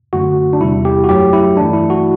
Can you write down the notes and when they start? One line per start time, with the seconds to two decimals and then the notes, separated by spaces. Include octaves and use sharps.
0.13 F#2 D3 A3 F#4
0.53 D4
0.60 E2 C3 G3 E4
0.85 G4
1.04 F#4
1.09 F#2 F#3 A3 G4
1.33 E4
1.57 G2 E3 A3 D4
1.74 E4
1.90 F#4